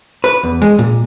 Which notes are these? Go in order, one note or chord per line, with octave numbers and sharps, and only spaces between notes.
B4
E2
G#3
A#2